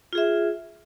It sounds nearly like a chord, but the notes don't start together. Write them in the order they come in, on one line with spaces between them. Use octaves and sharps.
F4 G#4 E5